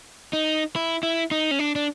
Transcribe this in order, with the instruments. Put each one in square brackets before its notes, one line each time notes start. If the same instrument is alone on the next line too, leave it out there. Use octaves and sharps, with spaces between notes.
[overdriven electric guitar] D#4
E4
E4
D#4
C#4
D4
D4